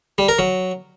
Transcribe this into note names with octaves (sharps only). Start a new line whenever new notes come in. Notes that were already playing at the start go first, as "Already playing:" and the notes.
G3
A#4
F#3